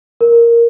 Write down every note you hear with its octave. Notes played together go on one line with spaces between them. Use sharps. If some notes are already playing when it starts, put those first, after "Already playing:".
A#4